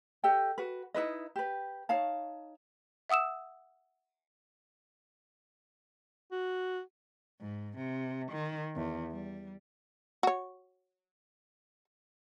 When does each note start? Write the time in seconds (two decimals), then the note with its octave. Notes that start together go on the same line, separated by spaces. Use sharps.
0.24 G4 A4 D#5 G5
0.58 F#4 B4
0.94 D#4 E4 B4 D#5
1.36 G4 B4
1.89 D#4 C#5 F5 A5
3.09 E5 F#5 D#6 E6 E7
6.32 F#4
7.39 G#2
7.77 C3
8.31 D#3
8.75 E2
9.10 G3
10.23 F#4 C#5